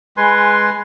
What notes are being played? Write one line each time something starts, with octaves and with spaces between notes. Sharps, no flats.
G#3 B4 G#5 C6